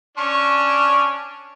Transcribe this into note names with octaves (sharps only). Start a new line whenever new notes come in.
C#4 D4 C#6